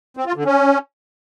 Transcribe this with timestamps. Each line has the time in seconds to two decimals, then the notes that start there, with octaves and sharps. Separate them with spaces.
0.17 C4
0.26 F4
0.36 D3
0.45 C#4